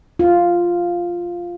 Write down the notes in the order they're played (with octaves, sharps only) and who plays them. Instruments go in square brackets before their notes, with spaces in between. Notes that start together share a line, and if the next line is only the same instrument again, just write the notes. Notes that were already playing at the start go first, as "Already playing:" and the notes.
[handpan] F4